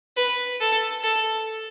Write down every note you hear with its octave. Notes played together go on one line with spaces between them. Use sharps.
B4
A4
A4